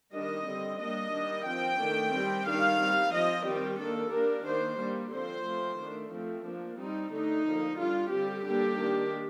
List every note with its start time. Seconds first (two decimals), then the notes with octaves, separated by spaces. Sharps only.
0.13 D#3 G3 D4 D#5
0.47 D3 G3 C4
0.80 G3 A#3 D4 D#5
1.14 D#3 G3 D4
1.46 F3 C4 G5
1.80 D#3 A3 D4
2.13 G3 C4
2.47 D#3 G3 D4 F5
2.80 G3 C4
3.13 F3 C4 D#5
3.46 D#3 G3 C4 G4
3.79 D#3 A#3 D4 A4
4.13 G3 A#3 D4 A#4
4.46 D#3 A#3 D4 C5
4.80 G3 A#3 D4
5.13 D3 F3 C4 C5
5.46 F3 A3 C4
5.79 D#3 A3 D4
6.12 F3 A3 C4
6.46 F3 A#3 D4
6.79 G3 C4 D#4
7.12 D3 A3 D4 D#4
7.46 D3 F3 A#3
7.78 G3 D4 F4
8.11 D3 G3 C4 G4
8.45 D3 G3 A#3 D4 G4
8.78 D#3 A#3 D4